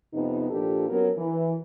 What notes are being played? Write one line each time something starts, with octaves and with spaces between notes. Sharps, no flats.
F2 C3 B3 D#4
A#2 F3 A#3 D4 G4 A4
F#3 B3 C#4 A#4
E3